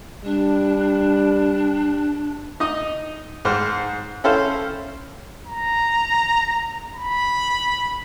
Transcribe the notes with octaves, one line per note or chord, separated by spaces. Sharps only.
G3 D4
D#4 D#5
G#2 C5 F6
C#4 E4 A4 C5 F5
A#5
B5